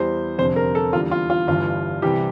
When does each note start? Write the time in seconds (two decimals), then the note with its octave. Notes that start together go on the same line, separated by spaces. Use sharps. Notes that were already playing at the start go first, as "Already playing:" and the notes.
Already playing: E2 E3 G3 C5
0.38 F1 F2 D3 G3 C5
0.56 A#4
0.75 A4
0.93 E2 D3 G3 F4
1.11 F4
1.30 F4
1.48 G1 G2 E3 F4
2.02 C2 C3 E3 G3 G4